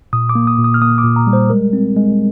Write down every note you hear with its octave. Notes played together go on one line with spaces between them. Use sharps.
A#2 D#6
D6
A#3
D#6
A#2
D#6
F6
A#3 D#6
D6
A#2
A#5
G3
C5
G#3 A#4
C4
G#3